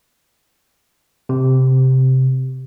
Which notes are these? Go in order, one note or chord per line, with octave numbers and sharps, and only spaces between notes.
C3